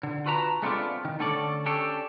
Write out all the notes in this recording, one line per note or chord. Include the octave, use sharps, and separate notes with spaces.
D3
F4 F#4 B4 A5 A#5
G#3 A3 B3 C4 D4 F4
D#3
D3 A3 C#4 A4 D5
C#4 D4 G4 A4